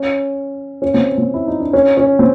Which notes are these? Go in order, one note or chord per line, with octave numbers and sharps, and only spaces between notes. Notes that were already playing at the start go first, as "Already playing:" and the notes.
Already playing: C#4
C#4
C4
C4
E4
D#4
D4
C#4
C#4
C4